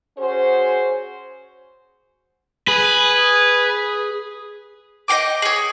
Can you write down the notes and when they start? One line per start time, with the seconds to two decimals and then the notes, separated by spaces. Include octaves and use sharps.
0.18 C#4 F#4 G#4 C5
2.68 G#4 B4
5.08 D#5 F5 G5 D6
5.42 G#4 C#5